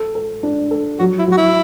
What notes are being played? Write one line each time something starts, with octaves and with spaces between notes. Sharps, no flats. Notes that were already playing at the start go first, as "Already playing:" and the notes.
Already playing: A4
A4
D4
A4
F#3 F#4
E4
F#3 F#4
E4